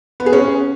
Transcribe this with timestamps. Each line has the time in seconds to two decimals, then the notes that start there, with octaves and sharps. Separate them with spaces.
0.20 B3
0.26 G#4
0.33 C#4